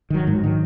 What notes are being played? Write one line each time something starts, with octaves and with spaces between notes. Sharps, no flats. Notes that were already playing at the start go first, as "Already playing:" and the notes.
D#3 F#3
G#2
D#3 F#3